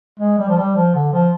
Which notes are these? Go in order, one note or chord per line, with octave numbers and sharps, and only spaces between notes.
G#3
G3
F3
G3
F3
D3
F3